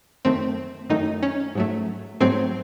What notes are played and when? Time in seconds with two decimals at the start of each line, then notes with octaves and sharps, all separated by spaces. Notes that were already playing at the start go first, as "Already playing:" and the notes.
0.25 F#2 D#3 A3 C4
0.90 F#2 D#3 A3 D#4
1.23 C#4
1.55 G#2 F#3 A3
2.20 G#2 F#3 A3 C4